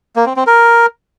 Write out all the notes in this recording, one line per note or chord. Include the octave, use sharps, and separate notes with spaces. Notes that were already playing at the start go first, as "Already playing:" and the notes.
A#3
C4
C4
A#4